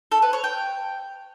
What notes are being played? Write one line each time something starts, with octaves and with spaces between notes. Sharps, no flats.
A4
B4
C#5
G5